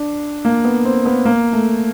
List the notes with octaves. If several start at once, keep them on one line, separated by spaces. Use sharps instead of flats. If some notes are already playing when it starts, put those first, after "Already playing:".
Already playing: D4
A#3
B3
C4
B3
A#3
A3